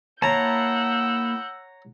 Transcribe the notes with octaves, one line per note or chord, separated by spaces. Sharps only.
A#3 E4 C#5 F#5 A5 A#5 E6 G6